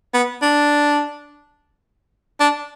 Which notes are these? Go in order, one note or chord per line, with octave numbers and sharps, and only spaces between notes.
B3
D4
D4